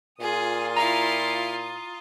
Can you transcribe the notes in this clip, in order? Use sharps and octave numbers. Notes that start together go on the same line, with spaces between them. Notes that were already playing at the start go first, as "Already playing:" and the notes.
A#2 F4 G#4 D#6
E4 F5 A#5